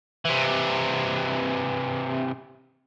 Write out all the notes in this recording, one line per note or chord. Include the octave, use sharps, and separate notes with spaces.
C3 E3